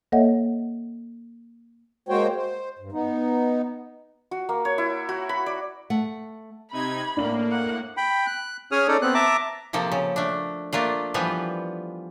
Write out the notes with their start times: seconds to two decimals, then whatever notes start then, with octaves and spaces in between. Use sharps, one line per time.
0.12 A#3 A4 C#5 D#5 E5 F#5
2.09 G#3 A#3 F#4 C5 C#5 G5
2.36 C5
2.79 G2
2.92 B3 D#4
4.31 F#4
4.49 A#3
4.65 C#5
4.78 E4
5.09 F#4
5.29 B5
5.46 D5
5.90 A3 F#5
6.72 C3 D#4 B5 G#6
7.17 A2 A#3 D4 F#7
7.52 F#5
7.97 G5 B5
8.26 F#6
8.72 C#4 G#4 C#5 D#6 F6
8.88 C#4 D#4 A4 D5
9.02 B3 C4 F#6
9.14 E5 A5 A#5 D6
9.73 C3 F3 A#3 A4
9.92 C#3
10.16 A3 D4
10.73 A3 A#3 D4 F4
11.14 E3 F3 G3 B3 F4